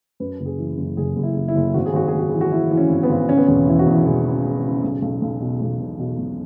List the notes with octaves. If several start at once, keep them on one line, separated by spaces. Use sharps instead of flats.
F#2 B4
F#1
G#4
E3
F#1
F#1 G#4
F#1
E4
F#1
E4
F#1
G#1 F#4
G#4
G#1 F#4
G#4
G#1
F#4
E3 G#4
F#4
E3 E4
E3
C#4
G#1
B3
G#1
C#3 C#4
B3
E1 C#4
E2 E4
F#4
E2 E4
E1 G#4
C#3
C#3
C#3
B1
B1
B1
B2
B1
B2
B2
B1